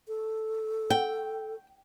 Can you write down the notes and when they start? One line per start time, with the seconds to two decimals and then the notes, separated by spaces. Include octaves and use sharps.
0.08 A4
0.90 G5